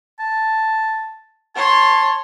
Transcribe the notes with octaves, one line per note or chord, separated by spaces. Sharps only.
A5
C#5 A5 C6